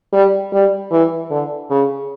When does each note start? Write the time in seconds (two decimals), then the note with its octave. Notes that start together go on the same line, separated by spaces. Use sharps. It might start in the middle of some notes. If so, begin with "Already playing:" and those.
0.13 G3
0.52 G3
0.91 E3
1.30 D3
1.71 C#3